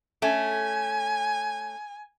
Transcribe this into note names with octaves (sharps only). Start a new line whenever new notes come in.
A3 C#4 G#5